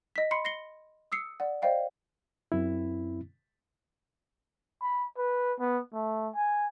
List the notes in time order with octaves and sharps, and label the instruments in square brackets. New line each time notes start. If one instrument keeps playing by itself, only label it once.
[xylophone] D#5 B6
B5 C6 C7 C#7
A#6 C7 C#7 G7
D#6 E6 C7 C#7
D5 F#5
C5 D5 D#5 F5 G5
[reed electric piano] F#2 C4 E4
[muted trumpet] B5
B4
B3
A3
G#5